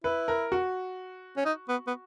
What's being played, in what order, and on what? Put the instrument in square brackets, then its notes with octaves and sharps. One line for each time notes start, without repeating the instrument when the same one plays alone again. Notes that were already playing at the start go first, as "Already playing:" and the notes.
[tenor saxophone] E4 [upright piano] B4
[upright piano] A#4
F#4
[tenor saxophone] C#4
D#4
B3
B3